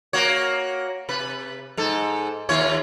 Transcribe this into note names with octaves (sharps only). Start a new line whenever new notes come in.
A#3 F#4 C#5
C3 B4
G#2 A4
D#2 F4 C#5